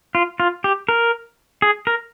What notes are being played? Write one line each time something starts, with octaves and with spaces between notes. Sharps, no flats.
F4
F4
G4
A#4
G#4
A#4